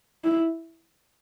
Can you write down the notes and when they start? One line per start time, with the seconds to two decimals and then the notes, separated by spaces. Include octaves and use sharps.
0.24 E4